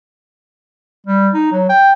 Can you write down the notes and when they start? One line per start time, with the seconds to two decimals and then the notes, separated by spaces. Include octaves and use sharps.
1.07 G3
1.34 D#4
1.52 F#3
1.69 G5